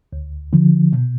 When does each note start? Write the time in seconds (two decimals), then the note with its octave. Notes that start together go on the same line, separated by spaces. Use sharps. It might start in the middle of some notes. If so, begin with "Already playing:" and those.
0.13 D2
0.53 D3 F3
0.93 B2